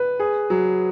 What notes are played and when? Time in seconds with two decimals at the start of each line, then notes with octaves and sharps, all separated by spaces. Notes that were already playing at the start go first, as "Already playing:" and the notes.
Already playing: B4
0.20 G#4
0.50 F#3